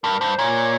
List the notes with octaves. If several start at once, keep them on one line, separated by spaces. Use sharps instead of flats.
G2 A#4
G2 C5
A#2 C#5